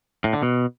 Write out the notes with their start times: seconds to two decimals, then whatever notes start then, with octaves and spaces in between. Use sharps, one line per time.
0.24 A2
0.33 D3
0.43 B2